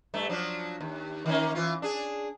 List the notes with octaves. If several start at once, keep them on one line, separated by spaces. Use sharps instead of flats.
G2 A3
F3 F#3 D4
D#2
D#3 A#3 C#4
E3 F4
D4 G#4